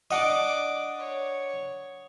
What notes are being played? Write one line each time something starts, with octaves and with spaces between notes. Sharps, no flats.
D4 D5 D#5 F#5 D6 D#6
C#5